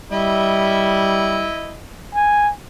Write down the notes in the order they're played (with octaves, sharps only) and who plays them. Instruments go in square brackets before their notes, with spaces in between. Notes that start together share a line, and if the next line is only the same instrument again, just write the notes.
[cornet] G3 [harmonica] E4 D#5 E5
[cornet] G#5